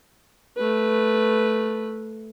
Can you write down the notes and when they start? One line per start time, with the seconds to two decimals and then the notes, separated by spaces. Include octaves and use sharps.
0.57 A3 B4